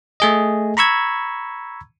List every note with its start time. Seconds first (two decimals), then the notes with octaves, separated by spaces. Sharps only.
0.20 A3 G#4 D#5
0.77 A#5 B5 C#6 E6 G#6